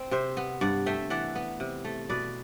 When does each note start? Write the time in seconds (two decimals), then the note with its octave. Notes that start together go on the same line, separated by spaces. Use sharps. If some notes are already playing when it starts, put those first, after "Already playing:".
Already playing: C4
0.11 C3 C5 E5
0.37 B3
0.61 G2 D5 F#5
0.86 A3 E5 G5
1.10 E3 D5 F#5
1.35 B3
1.60 C3
1.85 A3
2.10 B2 B4 D5